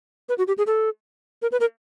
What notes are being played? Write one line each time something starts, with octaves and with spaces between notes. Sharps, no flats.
B4
F#4
G4
G#4
A4
A#4
B4
A#4